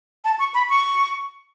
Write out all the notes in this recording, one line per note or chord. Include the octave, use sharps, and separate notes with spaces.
A5
C#6
B5
C#6